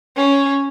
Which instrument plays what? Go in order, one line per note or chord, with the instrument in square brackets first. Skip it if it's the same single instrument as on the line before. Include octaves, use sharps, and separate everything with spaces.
[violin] C#4